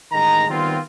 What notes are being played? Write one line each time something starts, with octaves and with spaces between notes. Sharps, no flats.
A1 D#3 G#3 A#5
D#3 G3 B3 C4 F4